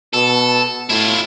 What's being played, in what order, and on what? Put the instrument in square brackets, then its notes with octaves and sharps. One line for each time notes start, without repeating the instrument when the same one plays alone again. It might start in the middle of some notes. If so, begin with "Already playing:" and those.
[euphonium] B2 [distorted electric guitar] A4
[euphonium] A2 [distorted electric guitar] E4 F4